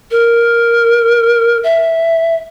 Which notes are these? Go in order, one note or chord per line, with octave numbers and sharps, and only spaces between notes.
A#4
E5